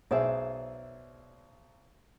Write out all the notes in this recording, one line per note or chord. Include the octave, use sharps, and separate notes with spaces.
B1 G#4 C5 D5 E5